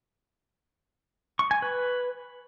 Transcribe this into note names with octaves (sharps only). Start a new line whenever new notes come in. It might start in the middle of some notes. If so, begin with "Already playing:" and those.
C#6
G#5
B4